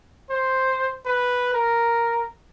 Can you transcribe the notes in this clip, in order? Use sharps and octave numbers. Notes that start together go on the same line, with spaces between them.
C5
B4
A#4